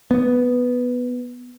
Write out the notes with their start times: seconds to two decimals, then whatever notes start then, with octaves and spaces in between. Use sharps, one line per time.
0.11 B3